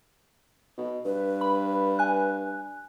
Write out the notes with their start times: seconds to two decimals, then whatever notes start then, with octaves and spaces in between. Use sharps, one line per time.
0.78 B2
1.05 G2 B4
1.41 B5
1.99 G#5 F#6